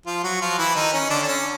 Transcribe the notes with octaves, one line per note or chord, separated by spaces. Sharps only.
F3 F4
F#3 F#4
F3 F4
E3 E4
D#3 D#4
C#4
D3 D4
D4
C#4